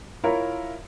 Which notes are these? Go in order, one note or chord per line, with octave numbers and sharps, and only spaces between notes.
E4 F4 A#4 C#5 E5